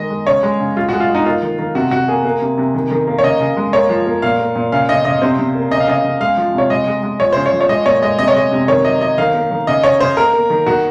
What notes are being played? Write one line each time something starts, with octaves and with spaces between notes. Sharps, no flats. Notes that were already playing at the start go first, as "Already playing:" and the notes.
Already playing: D#3 G#3 D#5
G#3
C#3 C#5
G#3
C#3
G#3 F4
G#3 F#4
F4
G#3
D#4
A#3 F4
D#3
D#3
C3 F#4
C3 F#4
A#3 G#4
A#3
C3
C3
D#3
D#3
A#3
C#5
C#3 D#5
C#3
G#3
A#3 C#5
F3
A#3
A#2 F5
A#3
A#2
C#3 F5
C#3 D#5
C#3 D#5
C3 C5
C3
A#3
C#3 D#5
F5
C#3 D#5
C#3
G#3 F5
F3
C3 C#5
G#3 D#5
G#3
G#3
F3 C#5
C#3 C5
C#5
F3
C#5
G#3 D#5
A#2 C#5
G#3 D#5
C3 D#5
C#5
G#3 D#5
C3
D#3 C#5
F#3 D#5
F#3 D#5
D#3 F5
A#3
D#3
C#3 D#5
C#3 C#5
C#3 C5
A#3 A#4
A#3
D#3
D#3 F#4